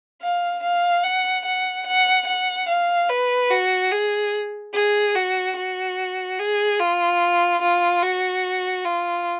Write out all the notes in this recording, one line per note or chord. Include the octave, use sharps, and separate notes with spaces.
F5
F5
F#5
F#5
F#5
F#5
F5
B4
F#4
G#4
G#4
F#4
F#4
G#4
F4
F4
F#4
F4